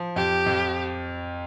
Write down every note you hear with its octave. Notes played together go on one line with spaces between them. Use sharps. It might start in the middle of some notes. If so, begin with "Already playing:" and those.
Already playing: F3
F2 G4
F2